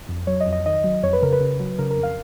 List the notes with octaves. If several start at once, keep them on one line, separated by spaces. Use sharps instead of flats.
F2
F#3 C#5
D#5
F2
D#5
D#3 D#5
F#3
F2 C#5
B4
C#3 A#4
B4
C#3
F#3
C#3 A#4
A#4
F2
F5